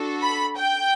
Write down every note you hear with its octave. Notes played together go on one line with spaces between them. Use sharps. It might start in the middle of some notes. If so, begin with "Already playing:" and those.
Already playing: D4 F#4 A4
B5
G5